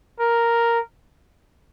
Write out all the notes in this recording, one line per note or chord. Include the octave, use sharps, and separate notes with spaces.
A#4